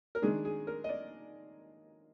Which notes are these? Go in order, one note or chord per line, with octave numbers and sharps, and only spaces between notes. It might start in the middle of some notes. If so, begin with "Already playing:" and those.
A#4
D#3 G#3 D4 G#4
G#4
A#4
D#5
D5